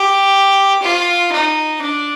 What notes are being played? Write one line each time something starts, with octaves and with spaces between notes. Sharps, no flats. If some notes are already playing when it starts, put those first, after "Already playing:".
Already playing: G4
F4
D#4
D4